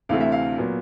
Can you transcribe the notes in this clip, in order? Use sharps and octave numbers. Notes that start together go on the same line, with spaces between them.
D2 C3 E3 A3 C4 F5
E5
F5
A#2 F#3 B3